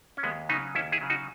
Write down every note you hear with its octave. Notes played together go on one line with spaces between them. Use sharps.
C#4
D#2 G#3 B3
C#3 F#3 B3 D#4
D#2 C#4 E4
E4 G#4
C#3 F#3
D#4 F#4